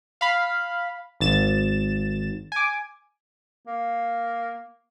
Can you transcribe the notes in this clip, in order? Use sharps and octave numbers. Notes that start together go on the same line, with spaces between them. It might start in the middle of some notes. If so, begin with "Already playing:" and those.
F5 B5
G#1 A6 E7
G#5 D6
A#3